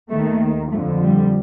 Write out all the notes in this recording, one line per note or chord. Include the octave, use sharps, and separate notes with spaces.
D#2 D#3 A3
F2 D3 F3 A3
G3